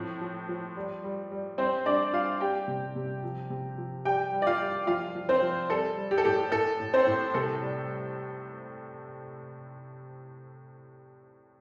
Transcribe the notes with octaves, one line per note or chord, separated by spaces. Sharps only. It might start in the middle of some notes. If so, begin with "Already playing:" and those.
Already playing: A2 F3 C4
F3
F3
G3
G3
G3
G3 C4 C5
G3 D4 D5
G3 F4 F5
G3 G4 G5
C3
C3
F3
C3
F3
G3 G4 G5
G3
D5
F4 F5
G3
F3 F4 F5
F3
C4 C5
F3
G3 A4
G3
G4
A4
A2 G4
A2 A4
A2
C4 C5
A2
C3 A4
G3